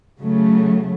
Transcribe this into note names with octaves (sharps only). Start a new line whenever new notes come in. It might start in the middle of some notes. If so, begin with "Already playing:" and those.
C#3 F#3 A3